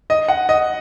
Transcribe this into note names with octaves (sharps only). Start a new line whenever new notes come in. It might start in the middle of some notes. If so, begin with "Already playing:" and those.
D#5
F#5
D#5